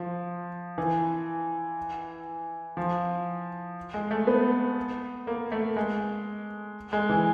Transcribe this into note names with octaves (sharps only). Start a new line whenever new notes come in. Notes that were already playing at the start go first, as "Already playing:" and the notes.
Already playing: F3
E3
F3
G#3
A3
B3
A#3
A3
G#3
G#3
E3